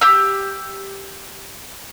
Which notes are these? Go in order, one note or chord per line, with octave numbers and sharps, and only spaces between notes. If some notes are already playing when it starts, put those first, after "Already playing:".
G4 E6